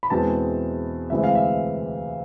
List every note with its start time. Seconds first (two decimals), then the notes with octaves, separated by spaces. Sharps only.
0.03 B5
0.10 E2 B2 G#3 C4 E4 A5
1.10 D2 C3 E3 G#3 C4 E5
1.24 F5
1.35 E5